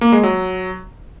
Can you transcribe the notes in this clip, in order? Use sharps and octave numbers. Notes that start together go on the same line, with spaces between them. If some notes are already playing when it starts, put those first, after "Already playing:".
A#3
G#3
F#3